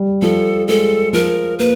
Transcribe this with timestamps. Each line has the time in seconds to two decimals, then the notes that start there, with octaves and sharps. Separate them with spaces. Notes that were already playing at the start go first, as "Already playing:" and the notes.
Already playing: G3
0.22 F3 A4
0.68 G#3 A4
1.13 F3 A#4
1.59 A#3 B4